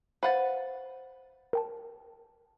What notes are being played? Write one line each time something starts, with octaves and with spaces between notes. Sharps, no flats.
B4 C5 F5 F#5 A6
A#4 G5 A5